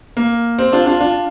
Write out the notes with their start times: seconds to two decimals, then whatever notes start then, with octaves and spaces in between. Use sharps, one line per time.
0.17 A#3
0.58 C4
0.72 D4 F4
0.86 D4 F4
1.01 D4 F4